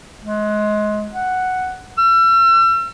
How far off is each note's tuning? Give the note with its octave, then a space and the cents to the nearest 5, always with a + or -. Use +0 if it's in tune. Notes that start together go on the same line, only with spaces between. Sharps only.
G#3 +25
F#5 +0
E6 +40